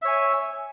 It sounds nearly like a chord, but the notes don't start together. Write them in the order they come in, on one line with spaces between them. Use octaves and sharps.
E5 C#5 G#5